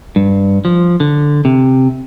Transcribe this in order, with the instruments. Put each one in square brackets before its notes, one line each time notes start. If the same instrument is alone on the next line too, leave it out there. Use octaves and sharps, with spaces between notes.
[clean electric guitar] G2
F3
D3
C3